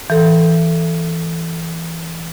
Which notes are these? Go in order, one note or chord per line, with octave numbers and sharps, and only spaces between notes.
E3 A4